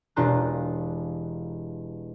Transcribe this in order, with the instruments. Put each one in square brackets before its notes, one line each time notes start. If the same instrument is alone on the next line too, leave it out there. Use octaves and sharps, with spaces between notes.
[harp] E1 D4 F4 G4 A#5 F#6